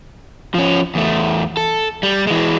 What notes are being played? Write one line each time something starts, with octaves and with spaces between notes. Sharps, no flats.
F3 C#4
E2 A3
A4
G3
E3 G#3